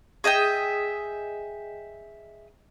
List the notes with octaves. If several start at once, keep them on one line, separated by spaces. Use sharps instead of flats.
G#4 D#5 E5 G5